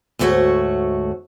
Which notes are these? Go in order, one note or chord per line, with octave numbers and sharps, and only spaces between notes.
D2 G#2 A3 F#4 C#5